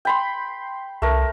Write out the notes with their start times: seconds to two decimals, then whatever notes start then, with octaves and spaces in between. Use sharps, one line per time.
0.05 G5 B5 C6
1.02 C2 A3 A#4